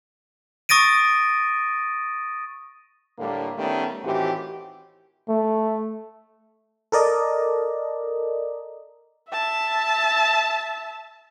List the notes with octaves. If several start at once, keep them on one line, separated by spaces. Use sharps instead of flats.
C#6 D#6 A6 A#6 D7 D#7
A2 D3 G3 A#3
D#3 G3 A3 B3 C#4
A2 D#3 E3 C4 F#4 G4
A3
A4 A#4 D5 D#5
E5 A5